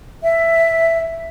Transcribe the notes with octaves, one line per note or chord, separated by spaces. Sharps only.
E5